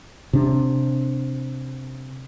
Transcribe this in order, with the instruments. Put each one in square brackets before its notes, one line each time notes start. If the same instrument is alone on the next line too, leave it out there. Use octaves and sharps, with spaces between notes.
[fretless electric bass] C3 D4